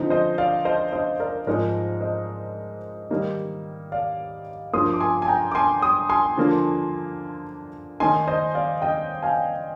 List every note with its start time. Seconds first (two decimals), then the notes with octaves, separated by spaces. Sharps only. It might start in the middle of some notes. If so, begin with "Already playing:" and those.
Already playing: D3 F3 C4 D#4
0.10 C5 D#5
0.38 D5 F5
0.65 C5 D#5
0.93 C5 D#5
1.20 A#4 D5
1.47 G#2 F3 G#3 C4 D#4 A#4 D5
2.01 C5 D#5
3.10 D#3 G3 A#3 D#4
3.92 D5 F5
4.73 G2 F3 A#3 C6 D#6
4.93 D6
5.00 G#5 C6
5.22 G#5
5.28 G5 A#5
5.51 D6
5.55 G#5 C6
5.82 C6 D#6
6.09 G#5 C6
6.37 D3 F3 A#3 D4
8.00 D#3 A#3 D#4 G#5 C6
8.28 C5 D#5
8.55 D5 F5
8.82 D#5 G5
9.23 F5 G#5